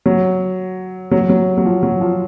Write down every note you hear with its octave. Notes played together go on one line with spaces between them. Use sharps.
F#3
F#3
F#3
F#3
F3
F#3
F3